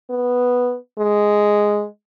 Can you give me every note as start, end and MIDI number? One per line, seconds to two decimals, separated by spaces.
0.10 0.76 59
0.98 1.86 56